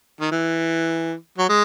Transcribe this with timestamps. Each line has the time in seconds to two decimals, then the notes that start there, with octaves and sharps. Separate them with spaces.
0.20 D#3
0.31 E3
1.38 F#3
1.49 G#3